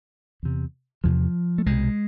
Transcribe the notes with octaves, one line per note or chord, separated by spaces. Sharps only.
E2 C3
E2 C3 F3
A3
C2 B2 G#3